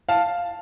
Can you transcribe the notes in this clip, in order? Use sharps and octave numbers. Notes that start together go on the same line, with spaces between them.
F5 A5